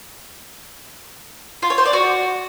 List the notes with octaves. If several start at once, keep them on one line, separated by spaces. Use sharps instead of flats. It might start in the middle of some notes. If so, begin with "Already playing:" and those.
F4
C#5
C5
D5
F#4